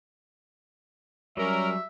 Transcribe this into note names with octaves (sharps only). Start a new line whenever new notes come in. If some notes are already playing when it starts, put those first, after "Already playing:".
F#3 G3 C#4 A#4 E5